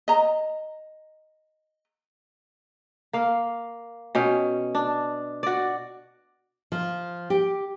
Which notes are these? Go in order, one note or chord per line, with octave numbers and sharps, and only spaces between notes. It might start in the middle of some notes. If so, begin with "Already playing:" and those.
D#5 A#5
A#3 F5
B2 C#4 G5
D4
F#4 D5
F3
G4